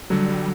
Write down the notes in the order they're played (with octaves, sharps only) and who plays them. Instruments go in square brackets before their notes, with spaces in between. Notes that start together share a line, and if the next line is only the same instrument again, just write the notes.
[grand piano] D3 F#3 [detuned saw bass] G3